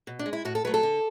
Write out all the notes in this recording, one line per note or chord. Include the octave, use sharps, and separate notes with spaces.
B2
D4
G#3
E4
A2 F#4
A4
F#3 A3 B4
A4
D3